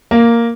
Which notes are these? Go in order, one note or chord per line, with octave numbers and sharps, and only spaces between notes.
A#3